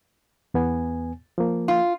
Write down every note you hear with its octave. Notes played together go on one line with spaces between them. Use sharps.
E2 B3 G#5
F3 A#3
F4